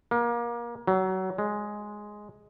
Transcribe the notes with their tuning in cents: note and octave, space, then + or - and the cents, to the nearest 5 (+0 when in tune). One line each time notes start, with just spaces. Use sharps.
A#3 +30
F#3 +25
G#3 +5